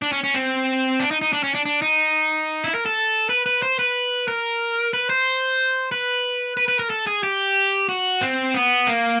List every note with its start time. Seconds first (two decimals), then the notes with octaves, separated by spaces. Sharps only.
0.02 D4
0.12 C#4
0.24 C#4
0.34 C4
1.00 D4
1.11 D#4
1.22 D#4
1.33 D4
1.43 C#4
1.54 D4
1.66 D4
1.82 D#4
2.64 E4
2.75 A#4
2.86 A4
3.29 B4
3.46 B4
3.62 C5
3.79 B4
4.28 A#4
4.93 B4
5.10 C5
5.92 B4
6.57 B4
6.68 B4
6.79 A#4
6.90 A4
7.07 G#4
7.23 G4
7.89 F#4
8.21 C4
8.54 B3
8.87 A#3